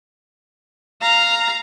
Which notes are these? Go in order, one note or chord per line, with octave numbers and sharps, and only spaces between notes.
F5 A#5